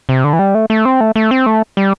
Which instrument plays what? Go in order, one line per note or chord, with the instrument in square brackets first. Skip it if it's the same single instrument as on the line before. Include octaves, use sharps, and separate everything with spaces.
[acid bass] C3
D3
E3
G3
A3
A3
C4
A3
A3
C4
A3
G3